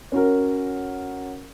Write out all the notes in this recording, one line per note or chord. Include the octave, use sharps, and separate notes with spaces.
C#4 F#4 A#4